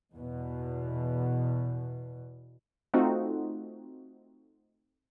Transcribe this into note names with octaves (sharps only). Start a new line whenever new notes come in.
E2 B2
A3 C4 D#4 F4 F#4